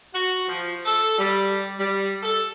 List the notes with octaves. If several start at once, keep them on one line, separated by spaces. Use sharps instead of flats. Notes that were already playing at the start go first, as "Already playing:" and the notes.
F#4
F3
A4
G3
G3
A4